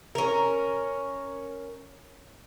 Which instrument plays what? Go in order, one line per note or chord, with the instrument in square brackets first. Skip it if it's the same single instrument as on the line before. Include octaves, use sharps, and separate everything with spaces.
[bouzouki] C#4 A#4